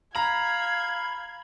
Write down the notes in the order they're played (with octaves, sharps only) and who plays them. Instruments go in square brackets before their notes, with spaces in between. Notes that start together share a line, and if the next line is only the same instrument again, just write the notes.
[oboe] F5 [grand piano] A#5 [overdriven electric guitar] B5 [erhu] G#6